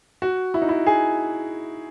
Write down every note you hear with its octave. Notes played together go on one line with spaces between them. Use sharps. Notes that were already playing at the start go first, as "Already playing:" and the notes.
F#4
E4
D#4
E4
G#4